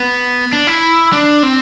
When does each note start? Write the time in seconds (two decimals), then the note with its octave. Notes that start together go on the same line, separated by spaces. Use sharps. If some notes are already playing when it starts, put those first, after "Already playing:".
Already playing: B3
0.52 D4
0.67 E4
1.13 D4
1.43 C4